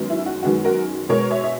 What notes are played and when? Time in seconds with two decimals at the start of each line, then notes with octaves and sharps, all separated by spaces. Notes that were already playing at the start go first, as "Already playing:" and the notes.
Already playing: F#2 D#3 G#3 B3
0.10 E4
0.26 F#4
0.43 F#2 D#3 G#3 B3 F#4
0.65 F#4 A#4
1.09 B2 G#3 B3 A#4 C#5
1.31 C#5 E5
1.44 E5